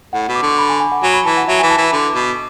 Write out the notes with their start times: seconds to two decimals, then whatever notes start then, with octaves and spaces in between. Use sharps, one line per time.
0.13 A2 F#5
0.28 B2
0.35 D6
0.42 D3 C#6
0.58 B5
0.69 G#5
0.80 G#5
0.92 F#5
1.03 F#3 G#5
1.14 B5
1.25 E3 A5
1.37 F#5
1.48 F#3 E5
1.59 E3 G#5
1.70 A5
1.78 E3 B5
1.93 D3 D6
2.15 B2